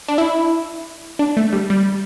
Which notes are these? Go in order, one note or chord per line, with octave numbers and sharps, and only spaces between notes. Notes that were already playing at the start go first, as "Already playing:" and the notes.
D4
E4
D4
A3
G3
G3